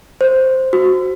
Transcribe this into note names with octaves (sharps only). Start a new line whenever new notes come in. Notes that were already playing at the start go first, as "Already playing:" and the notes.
C5
F#4